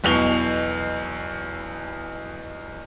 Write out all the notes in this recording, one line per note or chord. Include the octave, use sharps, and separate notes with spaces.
B1 E2 B2 F7 G7